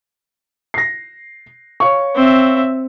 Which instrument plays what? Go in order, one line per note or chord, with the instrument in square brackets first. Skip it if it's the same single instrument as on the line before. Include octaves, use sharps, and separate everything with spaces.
[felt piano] A#6 C7
C#5 F5 C#6
[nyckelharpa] C4 E5